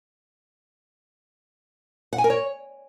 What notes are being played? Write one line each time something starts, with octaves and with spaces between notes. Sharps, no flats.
F#5
G#5
A#4
C#5